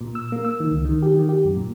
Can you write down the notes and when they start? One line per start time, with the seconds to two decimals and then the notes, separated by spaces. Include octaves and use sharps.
0.01 A#2
0.15 E6
0.32 A#3
0.45 E6
0.60 D#3
0.71 C#2
0.85 D#3
1.03 G4
1.14 D#3
1.29 G4
1.45 F#2
1.57 A#2